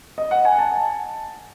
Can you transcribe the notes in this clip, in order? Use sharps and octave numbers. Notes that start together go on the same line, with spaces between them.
D#5
F#5
G#5
A5